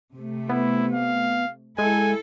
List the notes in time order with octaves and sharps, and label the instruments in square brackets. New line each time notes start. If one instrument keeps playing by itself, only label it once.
[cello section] C3 A3
[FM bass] B3 [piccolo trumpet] E4
[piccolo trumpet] F5
[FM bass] G#3 [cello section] E4 A4 [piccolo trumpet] G#5